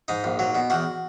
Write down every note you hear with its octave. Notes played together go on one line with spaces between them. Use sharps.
G#2 D#4
A#1
F#3
B2
E2 F#4